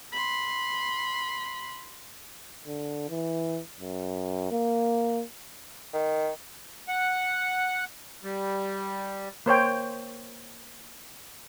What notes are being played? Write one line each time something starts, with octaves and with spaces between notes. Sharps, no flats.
B5 C6
D3
E3
F#2
A#3
D#3
F#5
G3
A#3 C5 C#5 G5